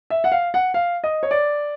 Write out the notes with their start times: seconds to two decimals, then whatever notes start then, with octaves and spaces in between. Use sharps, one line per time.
0.10 E5
0.24 F#5
0.32 F5
0.54 F#5
0.74 F5
1.04 D#5
1.23 C#5
1.31 D5